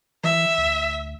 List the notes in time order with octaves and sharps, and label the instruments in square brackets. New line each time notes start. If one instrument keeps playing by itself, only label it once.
[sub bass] E3 [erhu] E5
[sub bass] D2